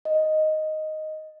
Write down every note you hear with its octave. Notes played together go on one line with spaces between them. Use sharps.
D#5